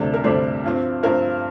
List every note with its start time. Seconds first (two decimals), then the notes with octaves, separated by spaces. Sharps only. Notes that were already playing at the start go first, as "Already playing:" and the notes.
Already playing: D2 C3 G3 D4
0.14 A#4
0.24 D2 C3 G3 D4 C5
0.64 G2 F3 C4
1.03 G2 F3 C4 A#4